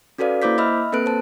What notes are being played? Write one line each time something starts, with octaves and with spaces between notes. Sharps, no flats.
C#4 F#4 A4 B4 D5 F5
A#3 E4 C5 D6 G6 B6
D#5 E5 B5 E6 F6
A#3 C4 A4 B4 F#6 D7
C5 A5